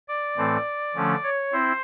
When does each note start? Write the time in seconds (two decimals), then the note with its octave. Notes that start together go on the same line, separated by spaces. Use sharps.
0.08 D5
0.37 A2 E3 A3 C4
0.95 D3 F3 A3 C#4
1.23 C#5
1.52 C4 E4 C5